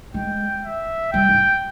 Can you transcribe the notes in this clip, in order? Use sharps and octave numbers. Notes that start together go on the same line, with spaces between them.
G#3 G5
E5
G3 G5
G#2